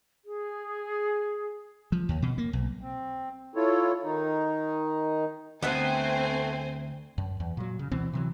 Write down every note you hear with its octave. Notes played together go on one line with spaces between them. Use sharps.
G#4
F3
D#2
B2
A#3
B1
C4
E4 F4 A4 C#5
D#3 D#4
D2 A3 B3 C4 C5 E5 G#5
F#2
E2
A#2 F#3
C#3
D2 B2 E3 C4
C3 E3 F#3